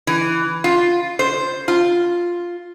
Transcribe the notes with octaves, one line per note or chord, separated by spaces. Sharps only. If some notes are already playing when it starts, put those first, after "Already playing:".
E3
F4
C5
F4